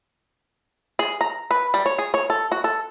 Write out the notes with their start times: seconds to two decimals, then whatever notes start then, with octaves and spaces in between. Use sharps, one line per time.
0.99 G#4
1.21 A#5
1.51 B4
1.74 G3
1.86 C#5
1.99 G#4
2.14 C#5
2.30 A4
2.52 F#4
2.64 A4